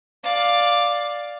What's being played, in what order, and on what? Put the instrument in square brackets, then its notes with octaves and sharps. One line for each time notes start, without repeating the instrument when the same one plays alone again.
[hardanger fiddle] D5 F5